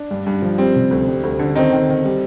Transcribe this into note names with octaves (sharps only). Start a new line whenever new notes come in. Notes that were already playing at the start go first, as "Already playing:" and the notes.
Already playing: D4
G2
G2
F3
G3 C4
C3
D2
G3
D2
D3
D#3 C4 D#4
D#3
D#3
G3